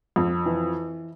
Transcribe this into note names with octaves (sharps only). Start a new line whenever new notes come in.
F2
E3